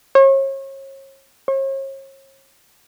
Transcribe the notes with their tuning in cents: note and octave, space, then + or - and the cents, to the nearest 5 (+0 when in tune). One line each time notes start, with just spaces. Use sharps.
C#5 -35
C#5 -40